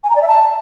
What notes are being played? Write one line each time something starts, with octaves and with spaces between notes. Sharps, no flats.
G#5
A#5
D5
E5
A5